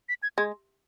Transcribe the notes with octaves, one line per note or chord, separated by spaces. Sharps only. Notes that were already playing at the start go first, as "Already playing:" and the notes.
B6
G#6
G#3 G#6